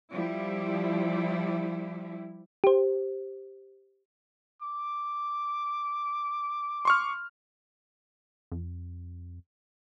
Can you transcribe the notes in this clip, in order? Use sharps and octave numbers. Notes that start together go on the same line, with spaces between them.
F3 G3 E4
G4 C5
D6
C6 C#6 F6
F2